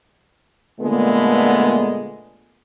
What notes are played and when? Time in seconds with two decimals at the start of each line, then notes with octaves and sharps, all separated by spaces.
0.80 A#2 D3 G#3 A3 B3